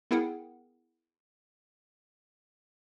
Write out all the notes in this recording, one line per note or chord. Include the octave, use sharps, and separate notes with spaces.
B3 E4 G#4 A#4 F#5 G5